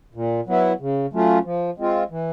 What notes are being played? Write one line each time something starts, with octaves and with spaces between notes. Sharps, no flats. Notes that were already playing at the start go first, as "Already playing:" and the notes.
A#2
F#3 B3 E4
C#3
F#3 A3 C#4 F4
F3
G#3 C4 F4
E3